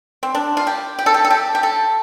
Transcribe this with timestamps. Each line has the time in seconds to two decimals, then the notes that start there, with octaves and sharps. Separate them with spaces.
0.23 C4
0.35 D4
0.57 F4
0.67 G4
0.99 G4
1.06 A4
1.14 G4
1.25 A4
1.30 G4
1.55 G4
1.63 A4